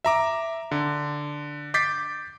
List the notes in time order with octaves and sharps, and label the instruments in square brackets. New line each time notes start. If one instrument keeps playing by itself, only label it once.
[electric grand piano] E5 A#5 D6
D3
D6 G6 A6 B6 C7